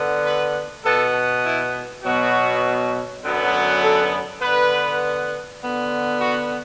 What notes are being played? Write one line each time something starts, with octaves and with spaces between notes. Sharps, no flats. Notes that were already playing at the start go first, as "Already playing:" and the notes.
Already playing: D3 B3
B4
B2 B3 A4
E4
B2 F#3 B3 F#4
F#2 D3 F#3 B3
A4
D3 B3 B4
D3 B3
F#4